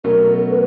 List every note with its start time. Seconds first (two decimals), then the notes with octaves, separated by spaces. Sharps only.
0.04 B2 F#3 A3 C#4 A#4
0.34 A4
0.42 A#4
0.50 B4